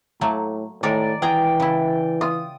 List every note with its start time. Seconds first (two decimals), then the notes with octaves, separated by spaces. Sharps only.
0.21 A2 F#3 A3 A#3
0.83 A2 D#3 G#3 A#4 D5
1.22 E3 G#4 G5 A#5
1.60 C#3 E4
2.21 F4 D#6